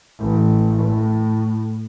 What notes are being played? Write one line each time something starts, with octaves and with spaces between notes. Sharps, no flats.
A1
A2